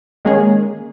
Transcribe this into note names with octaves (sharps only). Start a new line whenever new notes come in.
D#3 G#3 A#3 C#4 G#4